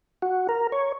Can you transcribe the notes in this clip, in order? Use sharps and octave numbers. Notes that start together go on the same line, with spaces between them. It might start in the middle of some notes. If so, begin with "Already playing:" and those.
F#4
A#4
C#5